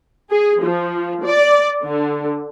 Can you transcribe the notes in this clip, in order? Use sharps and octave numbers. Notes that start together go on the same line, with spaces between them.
G#4
F3
D5
D3